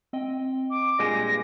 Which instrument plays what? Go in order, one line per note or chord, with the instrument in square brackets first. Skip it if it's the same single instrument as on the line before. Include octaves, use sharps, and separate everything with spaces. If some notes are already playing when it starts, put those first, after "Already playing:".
[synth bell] C4 D#5 G5
[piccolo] D6
[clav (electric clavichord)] G2 A#2 G#3 [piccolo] A#6